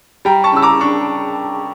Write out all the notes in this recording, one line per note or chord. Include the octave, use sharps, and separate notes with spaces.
G3 G5 A#5
A5 C#6
C#3 E6
A#5 D6
D4 C#6